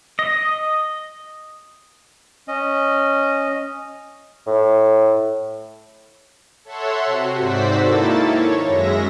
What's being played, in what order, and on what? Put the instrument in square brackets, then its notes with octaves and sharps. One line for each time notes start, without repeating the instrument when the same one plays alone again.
[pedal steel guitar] D#5
[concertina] C#4 D#5
[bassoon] A2
[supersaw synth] A4 C#5 E5 F#5 C6
C3 F#4
G#2 F#4 C5 D5 E6 B6
D#3 A#3 E4 A4 A6
C#5
F#2 G#3 E5 A#6